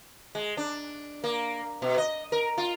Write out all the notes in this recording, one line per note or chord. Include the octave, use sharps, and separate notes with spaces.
G#3
D4
A#3
B2
D#5
A#4
F4